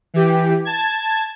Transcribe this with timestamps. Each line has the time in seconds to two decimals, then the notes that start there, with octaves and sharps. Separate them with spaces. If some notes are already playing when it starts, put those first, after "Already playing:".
0.14 E3 G4
0.65 A5 G#6